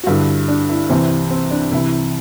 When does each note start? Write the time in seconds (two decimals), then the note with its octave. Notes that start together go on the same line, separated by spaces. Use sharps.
0.04 F#4
0.07 G2 D3 E4
0.48 D4
0.69 E4
0.89 C2 C3 E3 C4
1.31 C4
1.51 D4
1.71 C2 C3 E3 E4